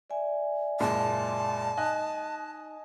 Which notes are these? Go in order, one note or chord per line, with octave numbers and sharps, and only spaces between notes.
D5 E5 G#5
F#1 A#2 G#3 A5
D#4 D#5 G#5 F#6